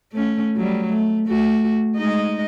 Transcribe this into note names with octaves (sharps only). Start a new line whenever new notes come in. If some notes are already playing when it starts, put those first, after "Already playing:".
A3 C#4
F#3 G3
A3
A3 F#4
G#3 D#4 D#5